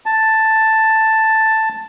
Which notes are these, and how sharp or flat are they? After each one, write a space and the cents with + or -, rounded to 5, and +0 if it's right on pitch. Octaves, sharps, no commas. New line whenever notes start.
A5 +5